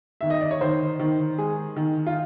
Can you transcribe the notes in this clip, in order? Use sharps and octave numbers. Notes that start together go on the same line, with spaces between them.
D#3 E5
D#5
D5
C#5
D#3 C5
D#3
G#3 G#4
D#3
F4